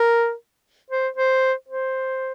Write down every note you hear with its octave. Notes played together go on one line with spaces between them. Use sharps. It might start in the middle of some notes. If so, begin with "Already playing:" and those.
Already playing: A#4
C5
C5
C5